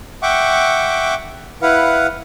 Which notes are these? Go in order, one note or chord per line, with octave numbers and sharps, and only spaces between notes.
E5 F#5 G5 C#6 D6
E4 B4 F5 F#5